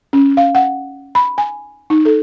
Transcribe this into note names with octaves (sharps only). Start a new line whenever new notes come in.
C#4
F5
F#5
B5
G#5
D#4
A4